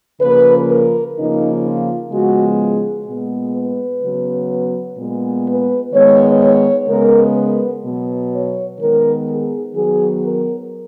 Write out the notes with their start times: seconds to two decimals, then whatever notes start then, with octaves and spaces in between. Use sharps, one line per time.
0.21 C#3 F3 A#3 B4
0.69 A#4
1.16 C#3 F3 A#3 D#4
1.65 F4
2.12 C#3 F3 G#3 B3 F#4
2.60 G#4
3.07 A#2 G#3 B3
3.55 B4
4.02 C#3 F#3 B3
4.98 A#2 G#3 B3
5.46 B4
5.94 D#3 G#3 B3 C#5
6.42 C#5
6.89 C#3 G#3 B3 A#4
7.37 B4
7.84 B2 F#3 B3
8.32 C#5
8.80 D#3 G#3 B3 A#4
9.28 G#4
9.75 D#3 F#3 B3 G#4
10.23 A#4